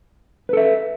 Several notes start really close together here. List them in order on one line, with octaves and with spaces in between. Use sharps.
B4 A4 E5